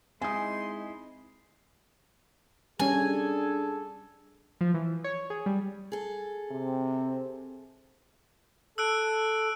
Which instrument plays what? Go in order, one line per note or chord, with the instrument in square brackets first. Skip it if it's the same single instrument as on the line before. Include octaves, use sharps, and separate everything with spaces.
[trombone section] G#3 [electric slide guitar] C4 D#4 E4 [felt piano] G#5 D#6 [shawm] C6
[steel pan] G3 C#4 [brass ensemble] D4 G#4 A4 [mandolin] G#5
[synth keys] F3
E3
C#5
G#4
G3
[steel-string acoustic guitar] G#4 A4
[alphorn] C3 [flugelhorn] C4
[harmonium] A4 [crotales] E6 F#6 D7